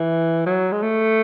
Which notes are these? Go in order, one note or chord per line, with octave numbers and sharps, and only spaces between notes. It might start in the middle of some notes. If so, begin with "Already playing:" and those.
Already playing: E3
F#3
G#3
A3